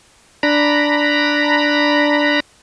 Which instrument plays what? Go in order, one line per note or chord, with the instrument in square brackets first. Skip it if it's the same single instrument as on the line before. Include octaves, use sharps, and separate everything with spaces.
[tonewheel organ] D4 A#5 B5